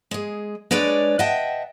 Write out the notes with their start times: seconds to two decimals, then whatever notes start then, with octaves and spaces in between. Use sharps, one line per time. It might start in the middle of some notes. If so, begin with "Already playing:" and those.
0.11 G#3 G#4
0.71 G#3 D4 B4 C#5 D5
1.19 D#5 E5 F#5 G5 A5